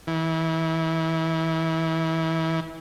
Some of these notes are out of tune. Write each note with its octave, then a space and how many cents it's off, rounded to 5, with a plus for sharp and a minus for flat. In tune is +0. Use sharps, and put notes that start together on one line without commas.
E3 -25